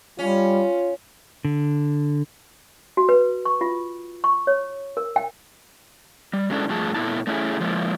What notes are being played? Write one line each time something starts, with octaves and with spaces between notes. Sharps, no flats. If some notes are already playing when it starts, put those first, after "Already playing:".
G3 C#4 F4
D3
F#4
B4
C#6
F4
C#6
C#5
A#4
G5
G3
F#3 G#3 C#4 D4 E4 A4
G2 F3 A3 F4 G#4 A5
A#2 A3 B3 E4 A5
A3 C#4 D4 E4 G#4
F3 G#3 A#3 E4